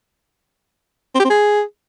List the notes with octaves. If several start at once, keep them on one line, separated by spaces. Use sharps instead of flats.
C4
G4
C4
G#4